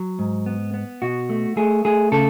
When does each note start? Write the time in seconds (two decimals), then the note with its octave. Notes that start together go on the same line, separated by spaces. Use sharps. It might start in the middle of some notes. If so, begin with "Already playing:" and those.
Already playing: F#3
0.19 G#2
0.46 B3
0.74 B3
1.02 B2 F#4
1.29 A3
1.57 A3 G#4
1.85 A3 G#4
2.12 C#3 A4